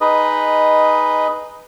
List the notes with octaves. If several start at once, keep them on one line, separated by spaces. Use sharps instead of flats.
D#4 G#4 B4 D#5